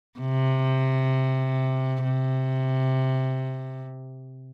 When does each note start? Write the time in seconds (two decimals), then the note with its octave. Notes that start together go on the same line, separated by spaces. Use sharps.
0.20 C3
2.04 C3